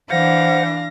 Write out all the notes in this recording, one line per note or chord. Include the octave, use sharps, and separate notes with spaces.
E3 D4 C5 F5 F#5 A#6